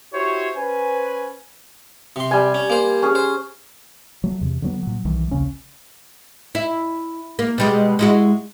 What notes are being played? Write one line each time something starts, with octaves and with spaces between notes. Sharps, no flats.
E4 F#4 G4 C5 C#5
C#4 B4 C5 G#5
C3 C6
G3 G#5
C#4
A#3 C5
C#4 G#4
C5
F#3 A3
E2 C3
D3 F#3 B3
A#2 F#3
B1 D#3 E3 G3
A#1 D#2 C#3 C#4
E4
A#3
B2 G3 G#3
G#3 E4 F#4